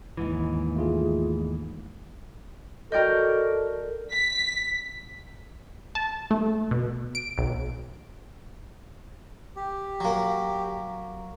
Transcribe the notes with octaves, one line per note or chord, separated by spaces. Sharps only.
D#2 G#2 E3
A3 F4 G#4
F#4 A4 A#4 D5 D#5 G5 G6
B6
A5
A3
B2
D7
B1
G4
F#3 A#3